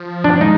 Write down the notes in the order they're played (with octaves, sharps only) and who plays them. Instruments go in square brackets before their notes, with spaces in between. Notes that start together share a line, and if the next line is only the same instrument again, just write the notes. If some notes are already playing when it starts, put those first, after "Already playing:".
Already playing: [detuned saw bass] F3
[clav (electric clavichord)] D4
[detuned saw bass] G#3 [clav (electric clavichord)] D#4